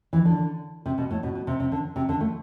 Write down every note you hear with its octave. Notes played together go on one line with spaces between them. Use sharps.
E3
D3
C3
B2
A2
B2
B2
C3
C3
D3
C3
D3
A3